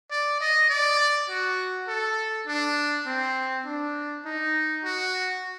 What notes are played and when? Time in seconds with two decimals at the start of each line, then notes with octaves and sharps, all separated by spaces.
0.11 D5
0.41 D#5
0.70 D5
1.30 F#4
1.88 A4
2.47 D4
3.06 C4
3.66 D4
4.25 D#4
4.84 F#4